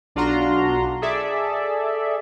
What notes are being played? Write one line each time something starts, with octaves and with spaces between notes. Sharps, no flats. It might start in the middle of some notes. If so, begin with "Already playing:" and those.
B1 D4 F4 F#4 A#5 C6
G#4 A4 D5 E5